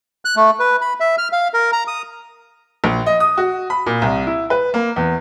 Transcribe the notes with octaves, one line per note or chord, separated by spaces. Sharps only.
F#6
A3
B4
B5
E5
F6
F5
A#4
A#5
D#6
A#1
D#5
D#6
F#4
B5
A#2
C2
E4
B4
A#3
E2